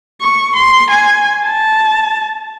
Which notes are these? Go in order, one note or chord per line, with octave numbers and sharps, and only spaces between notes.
C#6
C6
G#5
A5